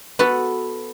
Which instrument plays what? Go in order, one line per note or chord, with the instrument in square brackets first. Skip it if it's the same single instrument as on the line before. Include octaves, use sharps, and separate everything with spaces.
[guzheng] B3 F#4 A4